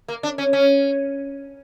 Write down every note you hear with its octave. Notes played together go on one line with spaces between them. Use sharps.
A#3
D4
C#4
C#4